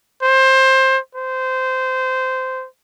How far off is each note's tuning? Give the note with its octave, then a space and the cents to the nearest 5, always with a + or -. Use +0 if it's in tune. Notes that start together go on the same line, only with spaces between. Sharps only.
C5 +20
C5 -15